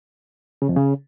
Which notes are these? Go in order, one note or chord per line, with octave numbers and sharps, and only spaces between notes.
C#3
F2
C#3